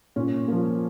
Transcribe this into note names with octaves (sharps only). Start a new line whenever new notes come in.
A#2 C#4
F3 A#3